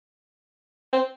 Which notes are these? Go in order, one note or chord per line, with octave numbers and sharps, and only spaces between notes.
C4